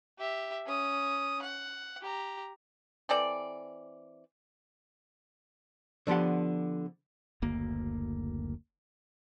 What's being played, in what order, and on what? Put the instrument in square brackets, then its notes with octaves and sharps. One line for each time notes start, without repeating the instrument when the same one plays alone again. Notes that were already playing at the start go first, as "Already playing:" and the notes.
[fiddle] G4 E5
C#4 D#6
F#5
G4 A#5
[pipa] E3 C4 A4 D5
[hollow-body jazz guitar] D3 F3 B3 G4 F#5
[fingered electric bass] F#1 D2 A#3